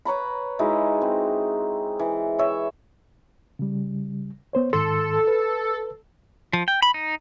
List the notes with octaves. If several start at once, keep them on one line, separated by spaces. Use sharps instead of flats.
B4 C#5 A#5 B5
G#3 D#4 E4 F#4
C4
E3
C#5 E5
C#3 G3
B3 C5 C#5
G#2 D#3 A4 C6
B4
F3
G5
B5
D#4